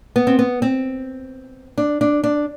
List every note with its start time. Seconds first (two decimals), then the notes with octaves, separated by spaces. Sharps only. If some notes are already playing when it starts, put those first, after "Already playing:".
0.16 B3
0.27 C4
0.39 B3
0.62 C4
1.78 D4
2.01 D4
2.24 D4